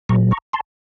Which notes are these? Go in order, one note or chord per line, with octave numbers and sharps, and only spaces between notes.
A#2 F#3 A#5 C#6
A#5 C#6
A5 C6